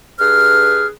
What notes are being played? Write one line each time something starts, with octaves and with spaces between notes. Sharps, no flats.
G2 G#4 B4 F6